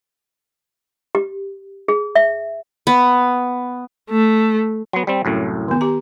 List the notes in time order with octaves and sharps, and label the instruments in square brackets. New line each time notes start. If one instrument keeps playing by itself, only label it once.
[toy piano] G4
G#4
E5
[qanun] B3
[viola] A3
[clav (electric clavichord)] F#3 B3 [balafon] C6
[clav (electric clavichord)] G3 C4
C2 F#2 A2
[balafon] D#3 B3
B3 G4 A#5